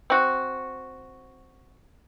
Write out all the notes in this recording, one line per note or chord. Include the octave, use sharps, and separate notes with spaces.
C4 F#4